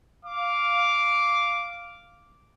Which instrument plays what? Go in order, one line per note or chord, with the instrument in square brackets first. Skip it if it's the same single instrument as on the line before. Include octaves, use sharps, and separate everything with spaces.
[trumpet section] F5 D6